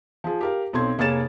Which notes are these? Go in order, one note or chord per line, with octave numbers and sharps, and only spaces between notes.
F3 G#4
G4 A#4 F5
B1 C4 A4 C6 G#6
F1 A#3 G#4 C#5 A6 E7